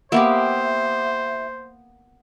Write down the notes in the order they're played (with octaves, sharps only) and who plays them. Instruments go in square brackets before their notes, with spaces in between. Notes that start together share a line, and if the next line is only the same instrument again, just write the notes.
[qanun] A#3 B3 [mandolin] E4 F#4 G4 [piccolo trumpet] C5 [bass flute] E5